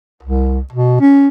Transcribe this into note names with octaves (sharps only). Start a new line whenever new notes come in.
C2
B2
C#4